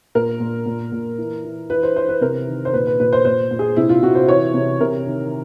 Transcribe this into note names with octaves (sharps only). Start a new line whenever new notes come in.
A#2 A#4
A#2
A#2
A#2
E3
E3
E3 B4
C5
E3 C5
B4
C3 A#4
D#3
C5
A#2 B4
B4
A#2 B4
C5
A#2 C5
A#2
G#4
C3 E4
F4
C3 F#4
C5
E3 C#5
C3
C3 A#4
D#3